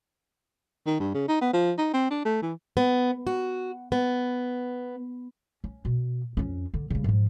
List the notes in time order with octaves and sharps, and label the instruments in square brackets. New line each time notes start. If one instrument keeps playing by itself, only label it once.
[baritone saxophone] D#3
G2
C#3
D#4
B3
F3
D#4
C4
D4
A3
E3
[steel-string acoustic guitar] B3
F#4
B3
[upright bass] C#4
B2
F2 C#4
D3
C#3 G3
G#2 F3